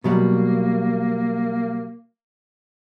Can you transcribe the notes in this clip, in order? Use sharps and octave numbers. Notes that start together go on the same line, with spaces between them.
B2 F#3 G3 A#3